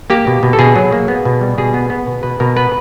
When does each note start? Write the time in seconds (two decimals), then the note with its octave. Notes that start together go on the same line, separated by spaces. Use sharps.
0.10 A#3 G4
0.27 B2
0.43 B2
0.53 A4
0.59 B2 G#4
0.76 F#3
0.92 A#3
1.08 B3
1.25 B2
1.41 G3
1.58 B2 G#4
1.74 B3
1.90 B3
2.07 B2
2.23 B2 B4
2.40 B2 A#4
2.57 B3 B4